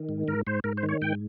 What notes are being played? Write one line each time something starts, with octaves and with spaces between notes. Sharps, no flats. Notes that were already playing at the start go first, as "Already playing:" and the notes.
Already playing: D#3
G#2
G#2 A#4
G#2 C5
G#2 A#4
C5
D#3
C#5
G#2 G5